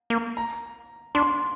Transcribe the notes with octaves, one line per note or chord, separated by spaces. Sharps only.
A#3
A#5
D4 C6